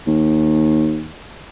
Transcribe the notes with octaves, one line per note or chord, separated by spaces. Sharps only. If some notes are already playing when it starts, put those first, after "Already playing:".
D#2